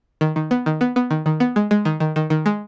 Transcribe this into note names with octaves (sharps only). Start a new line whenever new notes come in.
D#3
D#3
B3
D#3
B3
B3
D#3
D#3
B3
G#3
G#3
D#3
D#3
D#3
D#3
G#3